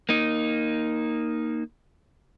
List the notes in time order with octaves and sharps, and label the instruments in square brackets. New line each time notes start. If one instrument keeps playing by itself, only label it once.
[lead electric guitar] A#3 D#4